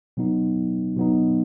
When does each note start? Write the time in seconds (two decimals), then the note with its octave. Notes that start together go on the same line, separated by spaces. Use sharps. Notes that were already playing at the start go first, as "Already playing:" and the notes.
0.17 B2 F#3 B3 D#4
0.97 B2 F#3 B3 D#4